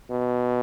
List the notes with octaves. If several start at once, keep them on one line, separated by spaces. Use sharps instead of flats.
B2